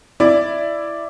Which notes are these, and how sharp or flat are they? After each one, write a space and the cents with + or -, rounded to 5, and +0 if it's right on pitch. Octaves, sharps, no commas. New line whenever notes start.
E4 +10 D5 +0